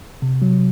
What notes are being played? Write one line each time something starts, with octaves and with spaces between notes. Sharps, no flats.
C3
F#3